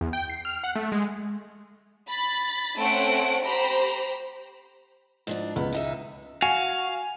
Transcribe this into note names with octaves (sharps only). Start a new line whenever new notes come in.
E2
G5
C7
F6
F#5
A3
G#3
B5 A6
A3 C4 C#4 C5 F#5 D7
G4 C5 A#5 B5
G#2 F3 D4
C#2 B3
C#3 D#4 E5
F#4 F5 G#5